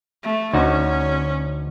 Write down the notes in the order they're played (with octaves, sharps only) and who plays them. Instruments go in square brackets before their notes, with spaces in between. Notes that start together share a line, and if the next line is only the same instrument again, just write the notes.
[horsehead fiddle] A3
[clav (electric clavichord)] D2 D#4 F#4 [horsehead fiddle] C#4